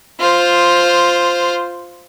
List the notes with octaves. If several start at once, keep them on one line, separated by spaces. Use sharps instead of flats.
F4 C5